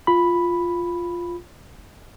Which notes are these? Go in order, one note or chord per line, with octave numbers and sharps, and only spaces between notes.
F4 B5